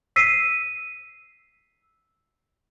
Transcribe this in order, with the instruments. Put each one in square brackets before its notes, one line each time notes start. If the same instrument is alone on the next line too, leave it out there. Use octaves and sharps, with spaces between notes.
[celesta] E6 B6 C7 D#7